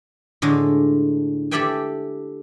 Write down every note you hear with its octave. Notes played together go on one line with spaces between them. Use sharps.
A2 D3 G#3
G4 A4 D5 E5 G5 G#5